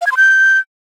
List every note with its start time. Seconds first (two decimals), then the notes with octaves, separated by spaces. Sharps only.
0.01 F5
0.07 G#6
0.12 C6
0.17 G6